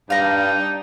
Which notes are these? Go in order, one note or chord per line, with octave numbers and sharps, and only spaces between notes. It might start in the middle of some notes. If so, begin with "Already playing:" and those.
G2 D4 D#4 F5 A#5